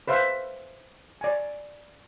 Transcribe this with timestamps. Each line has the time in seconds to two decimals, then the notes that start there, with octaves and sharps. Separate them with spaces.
0.08 B4 C5 E5 F5
1.21 D5 G#5